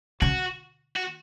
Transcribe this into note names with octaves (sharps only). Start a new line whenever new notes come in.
C#3 F#4
F#4